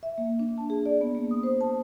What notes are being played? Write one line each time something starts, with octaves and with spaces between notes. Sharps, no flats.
E5
A#3
D4
A5
G#4
D5
B3
A#3
D#6
C5
A5